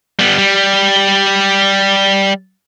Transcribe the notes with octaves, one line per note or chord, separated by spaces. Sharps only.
G3 B3
G3